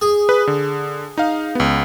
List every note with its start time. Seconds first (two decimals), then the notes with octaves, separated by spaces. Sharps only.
0.01 G#4
0.29 B4
0.47 D3
1.18 D#4 F5
1.55 C#2 B3